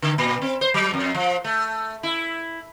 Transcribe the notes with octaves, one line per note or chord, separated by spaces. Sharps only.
D3
A#2
C4
C5
F#3
F2
F3
A3
E4